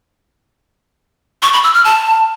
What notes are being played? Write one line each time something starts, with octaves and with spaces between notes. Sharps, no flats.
C#6
B5
E6
F6
A5